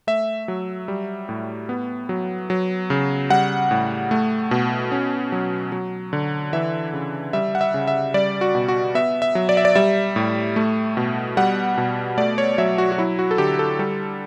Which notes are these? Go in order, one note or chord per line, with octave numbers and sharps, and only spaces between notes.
A3 E5
F#3
G3
A2
B3
F#3
F#3
C#3
G3 F#5
A2
A3
B2
C#4
F#3
F#3
D3
E3 E5
C#3
G3 E5
F#5
E5
C#3
E5
G3 D5
F#4
B2
F#4
B3 E5
E5
F#3
D5
E5
D5
G3 E5
A2
A3
B2
G3 F#5
B2
A3 D5
C#5
F#3 E5
F#4
F#4
F#3 E4
F#4
A4
D3 G4
A4
G3 A4